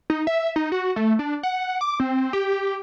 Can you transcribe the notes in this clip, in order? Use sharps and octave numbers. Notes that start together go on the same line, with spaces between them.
D#4
E5
D#4
F#4
A3
D4
F#5
D6
C4
G4
G4